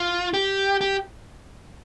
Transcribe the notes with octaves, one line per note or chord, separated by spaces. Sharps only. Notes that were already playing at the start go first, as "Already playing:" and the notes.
Already playing: F4
G4
G4